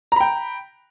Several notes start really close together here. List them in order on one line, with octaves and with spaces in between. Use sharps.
A#5 B5 G5